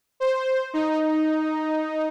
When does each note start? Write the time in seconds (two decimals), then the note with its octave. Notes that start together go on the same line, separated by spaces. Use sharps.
0.20 C5
0.74 D#4